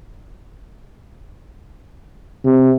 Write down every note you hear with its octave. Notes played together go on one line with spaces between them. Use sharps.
C3